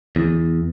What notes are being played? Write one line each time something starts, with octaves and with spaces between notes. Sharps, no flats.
E2